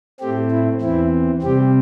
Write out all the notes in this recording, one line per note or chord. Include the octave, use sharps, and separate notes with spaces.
A2 A3 C4 G4
E4
E2 E3 C4 E4
C3 G3 C4 G4